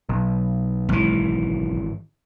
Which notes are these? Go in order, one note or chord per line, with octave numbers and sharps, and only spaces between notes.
B1
G#1 E3